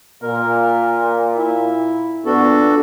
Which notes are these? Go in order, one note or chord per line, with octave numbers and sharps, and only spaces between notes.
A#2 A#4
E4
A#2 B3 D4 F#4 A4